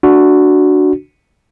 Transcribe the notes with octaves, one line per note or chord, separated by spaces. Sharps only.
D4 F#4